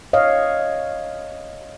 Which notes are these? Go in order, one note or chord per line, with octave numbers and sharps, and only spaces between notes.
C#5 D#5 F5